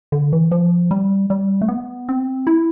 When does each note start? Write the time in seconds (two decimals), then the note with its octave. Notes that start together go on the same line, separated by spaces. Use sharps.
0.12 D3
0.33 E3
0.51 F3
0.91 G3
1.30 G3
1.61 A3
1.68 B3
2.09 C4
2.47 E4